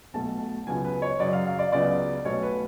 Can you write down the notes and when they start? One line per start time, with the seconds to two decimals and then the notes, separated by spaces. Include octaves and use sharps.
0.14 B1 B2 A3 A5
0.67 C#2 C#3 F#3 B3 G#5
0.84 B4
1.02 C#5
1.20 F#2 C#3 F#3 D5
1.33 F5
1.46 F5
1.59 D5
1.72 C#2 C#3 F#3 B3 D5
2.25 B1 B2 A3 C#5
2.43 B4